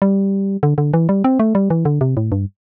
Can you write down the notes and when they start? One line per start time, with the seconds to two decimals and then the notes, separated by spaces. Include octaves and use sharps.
0.02 G3
0.63 D3
0.78 D3
0.94 E3
1.09 G3
1.24 C4
1.39 A3
1.55 G3
1.70 E3
1.85 D3
2.01 C3
2.17 A2
2.32 G2